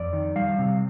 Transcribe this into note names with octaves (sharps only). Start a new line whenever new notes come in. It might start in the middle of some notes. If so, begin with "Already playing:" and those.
Already playing: F2 D5
D#3
G3 F5
C3